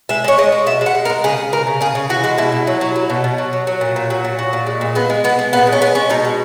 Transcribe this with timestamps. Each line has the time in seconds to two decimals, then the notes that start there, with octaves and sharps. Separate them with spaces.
0.09 G#3 E5
0.24 G#3 C#5
0.38 G#3 D#5
0.52 G#3
0.66 B2 E5
0.81 G#3
0.86 F#5
0.95 G#3
1.05 A#4
1.10 G#3
1.24 C#3 G#4
1.38 C#3
1.53 C#3 A#4
1.67 C#3
1.81 C#3 G#4
1.95 C#3
2.09 E3 F#4
2.24 G#3 F#4
2.38 B2 E4
2.52 B2
2.67 F#3
2.81 F#3
2.96 F#3
3.10 B2
3.24 B2
3.38 F#3
3.53 F#3
3.67 F#3
3.81 A#2
3.96 A#2
4.10 F#3
4.25 A#2
4.39 F#3
4.53 A#2
4.66 G#3
4.81 A#2
4.95 G#3 B3
5.10 G#3
5.24 G#3 B3
5.39 G#3
5.53 A#2 B3
5.67 G#3
5.73 C#4
5.81 G#3 B3
5.95 G#3 C#4
6.09 B2 D#4
6.25 G#3